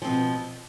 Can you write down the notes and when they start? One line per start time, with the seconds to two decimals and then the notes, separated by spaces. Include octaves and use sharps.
0.02 F3
0.04 C4
0.07 B2